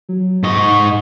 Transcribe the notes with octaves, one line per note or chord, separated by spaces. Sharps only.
F#3
G#2 D#5 C#6